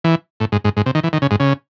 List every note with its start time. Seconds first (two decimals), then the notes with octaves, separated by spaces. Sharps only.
0.04 E3
0.40 A2
0.52 G#2
0.64 G#2
0.77 G#2
0.86 C3
0.95 D#3
1.03 E3
1.13 D#3
1.22 C#3
1.31 G#2
1.40 C#3